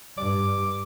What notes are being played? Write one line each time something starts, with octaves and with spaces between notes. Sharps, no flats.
G2 D6